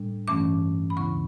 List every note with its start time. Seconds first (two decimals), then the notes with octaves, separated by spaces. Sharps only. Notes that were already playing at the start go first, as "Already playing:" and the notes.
Already playing: A2 G3 D4
0.28 G2 E3 A3 C#4 D6
0.90 B5
0.97 D2 C#3 E3 B3 E4 C#6